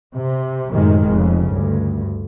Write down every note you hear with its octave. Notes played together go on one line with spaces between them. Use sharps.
C3
F#2 A2 C3 D#3 G#3
F1 F2 C#3
D2 G2